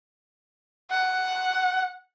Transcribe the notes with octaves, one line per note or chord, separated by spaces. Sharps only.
F#5